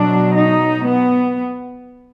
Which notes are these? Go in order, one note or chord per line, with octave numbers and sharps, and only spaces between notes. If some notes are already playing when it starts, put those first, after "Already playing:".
Already playing: B2 F#3 D4
D#4
B3